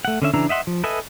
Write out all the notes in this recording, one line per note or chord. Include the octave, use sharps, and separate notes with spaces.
A3 F#5
D3 C#4 E5
C#3 E3 D4 A#5 E6
D#5 E5 F#5 C6
F3
A4 B4 D#5 E5 G#5